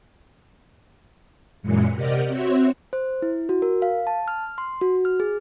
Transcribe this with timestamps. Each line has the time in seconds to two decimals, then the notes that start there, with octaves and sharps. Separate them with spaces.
1.62 F#2 A#2 E3 G#3 C#7
1.93 C3 G4 A#4 D5 D#5 F#5
2.28 C4 F#4 C#5 E5 C6
2.93 C5
3.22 E4
3.49 F#4
3.62 A#4
3.82 F5
4.07 A5
4.28 F6
4.58 C6
4.81 F#4
5.05 F6
5.20 G#4